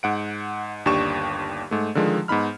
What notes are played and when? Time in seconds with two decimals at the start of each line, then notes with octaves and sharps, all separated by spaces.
0.03 G#2 F#5 D7
0.85 G1 D#2 D4 G4 C#6 E7
1.71 G#2 A3
1.95 D3 D#3 F3 G#3
2.28 G#2 B3 D#4 B5 F6